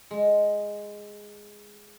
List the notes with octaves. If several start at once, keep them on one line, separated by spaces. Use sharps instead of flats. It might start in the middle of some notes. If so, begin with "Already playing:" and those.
G#3